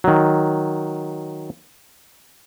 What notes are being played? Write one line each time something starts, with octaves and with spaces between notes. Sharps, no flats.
D#3 F#3